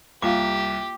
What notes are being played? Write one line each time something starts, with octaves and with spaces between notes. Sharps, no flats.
C2 A#3 F4 G4 F5 D6